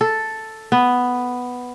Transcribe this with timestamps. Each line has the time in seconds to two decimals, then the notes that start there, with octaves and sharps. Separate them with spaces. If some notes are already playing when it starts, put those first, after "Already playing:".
0.01 A4
0.72 B3